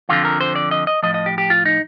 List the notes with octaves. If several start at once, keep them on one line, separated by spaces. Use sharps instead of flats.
F2 D3 F3 F4
A#4
C5
D5
D#5
D#5
A2 F3 D#5
D#5
G4
G4
F4
D#4